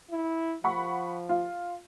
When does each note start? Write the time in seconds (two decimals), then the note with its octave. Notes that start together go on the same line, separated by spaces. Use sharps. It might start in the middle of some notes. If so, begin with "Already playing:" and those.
0.11 E4
0.64 F3 F#5 B5 C#6
1.29 F4